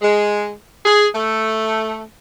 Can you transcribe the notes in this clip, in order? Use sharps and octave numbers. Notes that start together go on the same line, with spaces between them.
G#3
G#4
A3